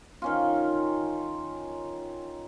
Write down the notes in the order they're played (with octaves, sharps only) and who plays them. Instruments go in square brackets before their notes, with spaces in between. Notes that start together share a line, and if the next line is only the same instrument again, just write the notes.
[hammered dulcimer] D#3 C#4 F4